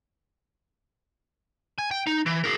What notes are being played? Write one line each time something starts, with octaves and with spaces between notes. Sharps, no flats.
G#5
G5
D#4
E3
G#4 A#4